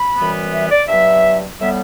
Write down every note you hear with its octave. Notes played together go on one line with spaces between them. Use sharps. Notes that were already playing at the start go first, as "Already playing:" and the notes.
Already playing: B5
F#2 E3 G3 B3
E5
D5
G2 F#3 B3 E5
A2 G3 B3 E5